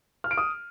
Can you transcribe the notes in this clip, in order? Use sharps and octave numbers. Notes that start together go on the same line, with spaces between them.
F6
D7
D#6